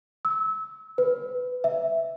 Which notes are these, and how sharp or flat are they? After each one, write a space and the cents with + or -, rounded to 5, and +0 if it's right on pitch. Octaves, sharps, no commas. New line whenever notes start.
E6 -25
B4 +20
E5 +0